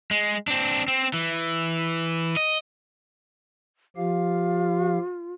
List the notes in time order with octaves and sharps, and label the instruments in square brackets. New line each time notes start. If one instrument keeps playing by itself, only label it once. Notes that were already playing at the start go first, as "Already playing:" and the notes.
[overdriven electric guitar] G#3
C4 D4
C4
E3
D#5
[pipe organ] F3 G4 F5 [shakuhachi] F4